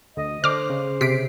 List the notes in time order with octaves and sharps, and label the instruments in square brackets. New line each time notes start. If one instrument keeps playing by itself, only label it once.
[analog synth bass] D2 [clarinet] D#5
[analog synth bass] D3 [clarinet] C5 [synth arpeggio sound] D6 F6
[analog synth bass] C#3
[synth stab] C3 C7 D7 [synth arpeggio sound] B6